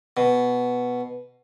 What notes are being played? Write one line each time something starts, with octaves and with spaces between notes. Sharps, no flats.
B2